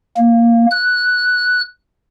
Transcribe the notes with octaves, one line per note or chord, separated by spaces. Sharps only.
A#3
F#6